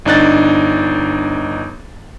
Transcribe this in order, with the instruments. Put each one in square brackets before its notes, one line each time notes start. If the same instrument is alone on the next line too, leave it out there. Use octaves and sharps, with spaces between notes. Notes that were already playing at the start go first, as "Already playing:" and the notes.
[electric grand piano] G1 D4 D#4 F#6 A6